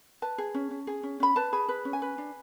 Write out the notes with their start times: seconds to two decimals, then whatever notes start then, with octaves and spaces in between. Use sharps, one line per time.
0.22 B4 A5
0.38 G#4
0.54 C#4
0.71 C#4
0.87 G#4
1.03 C#4
1.20 C#4 B5
1.36 B4 A5
1.53 G#4 B5
1.69 B4
1.85 C#4
1.93 G#5
2.02 B4
2.18 D4